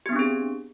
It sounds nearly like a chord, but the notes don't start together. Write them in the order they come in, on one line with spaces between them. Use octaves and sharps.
G4 B3 D4 C4 G#4